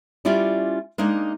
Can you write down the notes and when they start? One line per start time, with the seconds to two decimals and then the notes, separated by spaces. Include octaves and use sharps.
0.25 G3 C#4 E4 F4 D5
0.98 G#3 A#3 D4 D#4